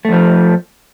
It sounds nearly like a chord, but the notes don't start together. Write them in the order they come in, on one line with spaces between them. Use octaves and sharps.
A3 F2 F3